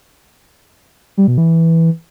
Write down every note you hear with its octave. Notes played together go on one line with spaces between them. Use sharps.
G3
B2
E3